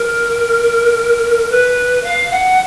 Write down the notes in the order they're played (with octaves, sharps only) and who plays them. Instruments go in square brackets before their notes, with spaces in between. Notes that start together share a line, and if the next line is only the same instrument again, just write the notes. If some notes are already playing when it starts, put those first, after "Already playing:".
Already playing: [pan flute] A#4
B4
F5
F#5